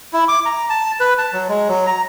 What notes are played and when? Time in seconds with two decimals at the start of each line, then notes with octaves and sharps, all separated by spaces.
0.13 E4
0.28 D6
0.45 A#5
0.70 A5
1.00 B4
1.18 A5
1.33 F#3
1.49 G#3
1.68 F#3
1.86 A#5